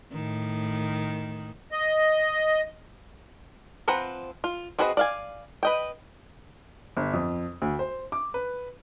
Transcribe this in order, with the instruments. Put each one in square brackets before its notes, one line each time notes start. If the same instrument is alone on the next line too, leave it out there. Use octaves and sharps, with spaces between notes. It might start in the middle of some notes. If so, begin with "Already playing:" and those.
[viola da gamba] A2 D#3
[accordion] D#5
[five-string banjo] F3 C4 B4 F#5 A#5
F4
C4 F#4 G#4 B4 D#5
D5 F5 G#5
B4 D#5 G5
[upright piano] G1
F2
D2
C5
D6
B4